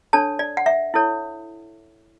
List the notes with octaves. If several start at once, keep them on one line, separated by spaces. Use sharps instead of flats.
D4 A4 C#5 A5
D5
F#5
E5
E4 A4 C#5